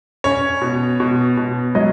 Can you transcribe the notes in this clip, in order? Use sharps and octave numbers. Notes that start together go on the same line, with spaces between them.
C#4 C#5
B2
B2
B2
F#3 D#5